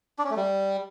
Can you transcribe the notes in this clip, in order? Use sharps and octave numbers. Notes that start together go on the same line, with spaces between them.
D4
C#4
A3
G3